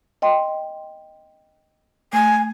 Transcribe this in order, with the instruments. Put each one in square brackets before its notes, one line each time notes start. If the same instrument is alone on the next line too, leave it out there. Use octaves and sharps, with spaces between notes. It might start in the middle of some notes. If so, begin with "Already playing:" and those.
[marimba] D#5 G5 C6
[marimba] A3 [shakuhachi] G#5